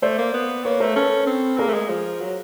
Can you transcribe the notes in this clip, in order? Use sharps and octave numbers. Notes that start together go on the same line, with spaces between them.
A3 C5 D5
A#3
B3
A#3 B4 C#5
A3 A#4 C5
C#4 A4 B4
C4
A#3 G#4 A#4
A3
G#3
F3
F#3